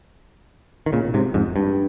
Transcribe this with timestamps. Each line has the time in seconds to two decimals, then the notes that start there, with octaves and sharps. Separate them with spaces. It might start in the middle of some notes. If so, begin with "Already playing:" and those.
0.86 D#3
0.93 A#2 C#3
1.14 G#2 C3
1.34 F2 G#2
1.56 G2